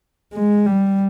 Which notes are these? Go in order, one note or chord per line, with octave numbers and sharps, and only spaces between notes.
G#3
G3